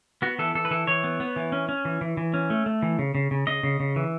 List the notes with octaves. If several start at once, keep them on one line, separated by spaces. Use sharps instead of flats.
B3 F#4
E3 A4
E3 A4
B4
E3 A4
E3 C#5
B3
B3
E3
C#4
C#4
E3
E3
E3
C#4
A3
A3
E3
C#3
C#3
C#3
C#3 D#5
C#3
C#3
E3